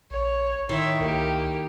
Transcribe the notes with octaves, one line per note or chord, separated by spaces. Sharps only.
A#1 C#5
A2 D#3 E4 C#5 E5 C6
C#2 A#3 G4